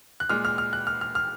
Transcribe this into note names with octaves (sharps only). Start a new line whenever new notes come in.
F#6
A#2 G#3 F6
F6
F6
F#6
F6
F6
F6